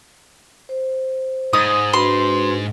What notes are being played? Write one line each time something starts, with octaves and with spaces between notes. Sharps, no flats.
C5
G#2 D#6
D4 F#4 B4 C6